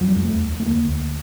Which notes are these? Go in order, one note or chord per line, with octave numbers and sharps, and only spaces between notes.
F2 F#3
G3
F2 G#3
A3
E2
E2
A3
D2 A#3
D2